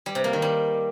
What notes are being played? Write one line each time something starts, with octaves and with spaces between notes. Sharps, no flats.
G3
C3
A#3
D#3
G3